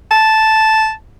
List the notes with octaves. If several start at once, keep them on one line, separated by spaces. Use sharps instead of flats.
A5